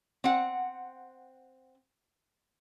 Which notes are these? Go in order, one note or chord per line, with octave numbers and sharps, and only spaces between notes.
C4 F#5